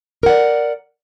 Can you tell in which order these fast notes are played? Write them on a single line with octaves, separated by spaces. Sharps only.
A#4 F#5 D5